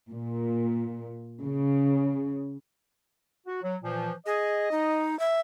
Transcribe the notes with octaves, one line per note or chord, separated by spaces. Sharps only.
A#2
C#3
F#4
F#3
A#2 E3 F3
G#4 D#5
D#4
E5